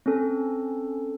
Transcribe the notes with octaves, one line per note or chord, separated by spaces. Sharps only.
C4 C#4 A4